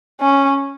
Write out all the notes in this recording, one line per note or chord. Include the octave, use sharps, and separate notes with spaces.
C#4